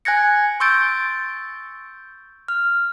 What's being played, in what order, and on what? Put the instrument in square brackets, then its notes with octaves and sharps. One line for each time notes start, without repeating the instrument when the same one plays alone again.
[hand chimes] G#5 F#6 G#6 A#6 C#7
C6 C#6 E6 G6 A6 D7
F6